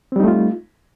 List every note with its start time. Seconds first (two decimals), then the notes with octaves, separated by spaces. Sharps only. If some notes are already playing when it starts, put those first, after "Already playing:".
0.12 C4
0.16 G3
0.20 D#4
0.24 A3
0.28 F4